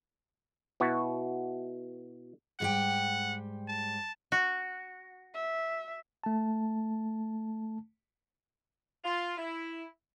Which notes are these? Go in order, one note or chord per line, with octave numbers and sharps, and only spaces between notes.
B2 B3 E4 F#4
G#2 G3 F#5 G5
A5
F#4
E5
A3 A5
F4
E4